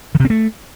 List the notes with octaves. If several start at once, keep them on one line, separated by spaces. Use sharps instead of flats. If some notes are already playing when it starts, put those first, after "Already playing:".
D#3
C3
C4
A3